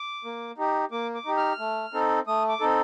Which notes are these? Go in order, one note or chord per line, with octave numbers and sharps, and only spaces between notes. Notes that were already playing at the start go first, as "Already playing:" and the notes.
Already playing: D6
A#3
D#4 G4
A#3 D6
D6
D#4 G4
F6
A3
C4 D#4 A4
A3 D#6
D6
C4 D#4 A4